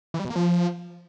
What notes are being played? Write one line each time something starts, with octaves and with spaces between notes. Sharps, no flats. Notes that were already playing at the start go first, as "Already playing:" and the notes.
E3
G3
B2
A#3
F3